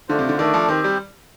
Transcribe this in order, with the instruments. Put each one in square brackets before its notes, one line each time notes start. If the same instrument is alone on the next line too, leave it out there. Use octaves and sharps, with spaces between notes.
[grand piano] D3 [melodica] A3 D4 F4 C5
[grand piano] C3
D3
[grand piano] D#3 [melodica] A3 D4 A4 D5
[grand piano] F3
[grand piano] D#3 [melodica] C4 G4 C5
[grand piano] G3